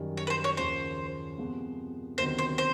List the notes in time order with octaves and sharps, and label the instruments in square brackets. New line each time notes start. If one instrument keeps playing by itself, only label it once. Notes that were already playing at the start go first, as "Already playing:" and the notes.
Already playing: [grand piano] F#2 D#3 G3
[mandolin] C#5
B4
C5
C#5
[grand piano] D#2 C#3 F3 [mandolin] C5
[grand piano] C3 F3 G#3 B3
[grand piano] D2 C3 D#3 F#3 B3 [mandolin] C5
[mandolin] C5
C5